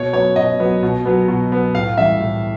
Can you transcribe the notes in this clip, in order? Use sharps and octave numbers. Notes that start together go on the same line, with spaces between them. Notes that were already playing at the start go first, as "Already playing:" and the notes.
Already playing: B2 C#5
F#3 B3 C#5
B2 D#5
F#3 B3
B2
F#3 B3
B2
F#3 B3
A2 F5
E3 G3 E5
A2